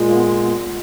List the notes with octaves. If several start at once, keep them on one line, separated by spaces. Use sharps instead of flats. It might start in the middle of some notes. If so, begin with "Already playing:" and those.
Already playing: A#2 G#3
A#3
B3
B3